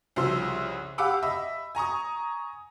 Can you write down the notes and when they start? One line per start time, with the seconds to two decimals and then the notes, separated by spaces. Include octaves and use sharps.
0.16 C2 C#3 F3 C6 E6
0.98 G4 F5 F#5 B5 D6 E6
1.22 D#5 E5 B5
1.75 G#5 A#5 C#6 D#6